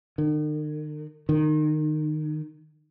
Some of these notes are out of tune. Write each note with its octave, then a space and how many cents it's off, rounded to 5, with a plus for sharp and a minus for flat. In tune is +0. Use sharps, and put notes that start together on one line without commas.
D#3 -45
D#3 -25